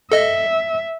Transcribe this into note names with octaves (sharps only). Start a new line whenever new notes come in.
A4 D#5 E5